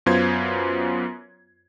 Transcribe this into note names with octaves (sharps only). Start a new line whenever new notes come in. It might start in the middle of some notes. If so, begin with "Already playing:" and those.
F#2 B3 F4 C5 G#6